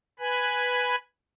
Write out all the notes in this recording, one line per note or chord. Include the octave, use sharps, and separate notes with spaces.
B4 G#5 B5